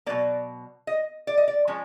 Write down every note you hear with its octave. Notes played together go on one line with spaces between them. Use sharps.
B2 F#3 A#3 D5
D#5
D5
D#5
D5
F3 G#3 C#4